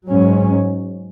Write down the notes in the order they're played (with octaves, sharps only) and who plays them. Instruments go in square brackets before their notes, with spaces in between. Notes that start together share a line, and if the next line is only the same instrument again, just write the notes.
[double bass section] G#2 F#3 C#4